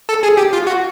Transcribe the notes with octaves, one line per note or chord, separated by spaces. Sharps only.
A4
G#4
G4
F4
F#4